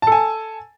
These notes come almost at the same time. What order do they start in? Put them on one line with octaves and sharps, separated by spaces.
A5 A4 G#5